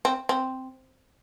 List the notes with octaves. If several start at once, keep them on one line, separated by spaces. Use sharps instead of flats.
C4
C4